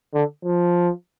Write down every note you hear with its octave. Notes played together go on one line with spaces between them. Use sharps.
D3
F3